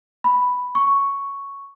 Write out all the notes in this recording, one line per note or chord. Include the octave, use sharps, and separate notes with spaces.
B5
C#6